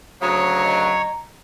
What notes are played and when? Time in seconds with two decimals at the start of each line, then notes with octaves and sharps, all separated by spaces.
0.22 D2 C#3 F#3 C#5 A#5 D#6
0.64 D#5